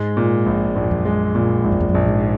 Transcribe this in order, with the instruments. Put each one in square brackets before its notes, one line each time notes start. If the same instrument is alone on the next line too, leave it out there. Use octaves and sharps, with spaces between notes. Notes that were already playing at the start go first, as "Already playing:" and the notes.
Already playing: [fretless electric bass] G#2 [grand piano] G#3
[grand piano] A#2
A#1
[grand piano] A#1 [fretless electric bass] G#2
[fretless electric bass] F#2
F2
F#2
[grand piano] G#3
A#2
[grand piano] A#1 [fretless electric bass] G#2
[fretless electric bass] F#2
F2
F#2
[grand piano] A#1
[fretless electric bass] G#2